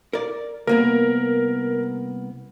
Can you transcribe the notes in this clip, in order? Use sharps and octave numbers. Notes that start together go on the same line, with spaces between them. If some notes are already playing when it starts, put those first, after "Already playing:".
A#4 D5
C2 A#3 B3 A#4